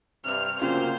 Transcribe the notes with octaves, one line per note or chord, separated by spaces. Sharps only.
G2 C3 F6
D2 C#3 F#3 A#3 C4 F4 C5